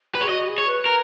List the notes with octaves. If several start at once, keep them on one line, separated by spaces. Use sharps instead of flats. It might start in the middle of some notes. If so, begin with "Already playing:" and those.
B4
G#4 C#5
F#4 D#5
G#4
C#5
B4
A#4